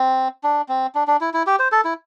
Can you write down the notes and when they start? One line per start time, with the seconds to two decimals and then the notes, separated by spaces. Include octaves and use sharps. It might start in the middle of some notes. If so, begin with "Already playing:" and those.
Already playing: C4
0.44 D4
0.69 C4
0.95 D4
1.08 D4
1.21 E4
1.34 E4
1.47 G4
1.59 C5
1.72 A4
1.85 E4